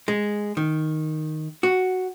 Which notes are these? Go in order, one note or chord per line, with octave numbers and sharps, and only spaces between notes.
G#3
D#3
F#4